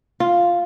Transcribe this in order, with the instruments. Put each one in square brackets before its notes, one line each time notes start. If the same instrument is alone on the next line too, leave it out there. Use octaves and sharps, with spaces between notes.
[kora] F4